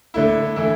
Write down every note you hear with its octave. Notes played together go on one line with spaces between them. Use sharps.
D3 A3 E4
E3 A3 E4